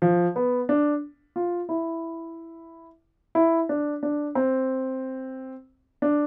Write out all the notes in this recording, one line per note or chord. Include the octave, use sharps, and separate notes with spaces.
F3
B3
D4
F4
E4
E4
D4
D4
C4
D4